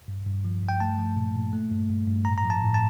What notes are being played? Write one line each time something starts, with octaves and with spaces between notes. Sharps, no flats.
G2
G2
F3
G2
G5
A3 A5
F3
A#2
A#2
A3
G2
G2
G2
A2 A#5
A#5
F3
A5
A2
A5